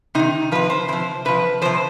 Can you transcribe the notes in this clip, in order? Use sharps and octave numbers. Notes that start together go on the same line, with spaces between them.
C3 D#3 D#4
C3 F3 B4
C5
C3 F3 C5
C3 F3 B4
C3 F3 C5